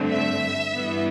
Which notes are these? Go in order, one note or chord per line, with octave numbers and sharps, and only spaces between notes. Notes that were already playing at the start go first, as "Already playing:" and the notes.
Already playing: G2 D3 A3 C4
E5
G2 E3 B3